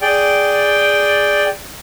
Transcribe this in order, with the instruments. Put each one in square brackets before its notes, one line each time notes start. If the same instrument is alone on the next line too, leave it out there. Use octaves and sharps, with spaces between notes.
[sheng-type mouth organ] G#4 D5 G5